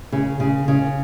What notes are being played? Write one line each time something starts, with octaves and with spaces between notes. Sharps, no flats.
C#3
C#3
C#3